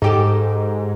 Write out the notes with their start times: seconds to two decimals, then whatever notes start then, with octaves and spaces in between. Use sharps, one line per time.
0.02 G#2 D#4 G4 A4